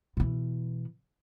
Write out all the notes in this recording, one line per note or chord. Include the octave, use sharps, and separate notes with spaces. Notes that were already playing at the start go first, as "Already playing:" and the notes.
B2 E3